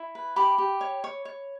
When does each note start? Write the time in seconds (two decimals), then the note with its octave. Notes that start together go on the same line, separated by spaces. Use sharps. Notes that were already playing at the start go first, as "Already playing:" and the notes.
Already playing: E4
0.15 B4
0.36 G4 B5 D6
0.58 G4
0.81 C#5
1.04 C#5
1.25 C#5